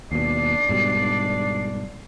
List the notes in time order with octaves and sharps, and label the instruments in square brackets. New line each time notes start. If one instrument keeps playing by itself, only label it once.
[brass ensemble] G#1 D4 D5 [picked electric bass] D#2 B2 [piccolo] C7
[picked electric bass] G#2 B2 G3